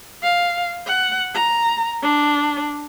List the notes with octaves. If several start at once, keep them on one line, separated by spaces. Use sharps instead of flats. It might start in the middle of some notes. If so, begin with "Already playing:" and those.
F5
F#5
A#5
D4